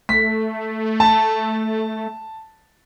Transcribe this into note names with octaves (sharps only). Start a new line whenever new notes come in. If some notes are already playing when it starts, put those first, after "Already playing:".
A3 B6
A5